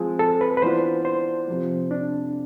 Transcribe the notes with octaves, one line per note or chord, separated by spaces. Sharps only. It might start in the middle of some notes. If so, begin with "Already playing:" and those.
Already playing: F3 G#3 C4 G#4
A4
B4
B4
E3 B3 D4 F4 C5
C5
F2 C3 F3
D4